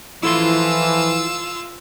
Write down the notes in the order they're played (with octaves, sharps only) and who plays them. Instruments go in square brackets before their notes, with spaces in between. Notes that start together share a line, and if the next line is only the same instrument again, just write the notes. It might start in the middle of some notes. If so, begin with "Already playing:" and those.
[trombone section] E3 F3 [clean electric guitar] E4 A4 C6 [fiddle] F4 E6